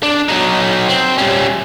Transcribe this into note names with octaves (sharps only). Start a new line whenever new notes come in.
D4
F#3 D#4
C4
G3 C#4